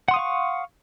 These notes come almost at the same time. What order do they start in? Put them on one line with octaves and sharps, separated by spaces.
F#5 C6 D#6 F5 C#6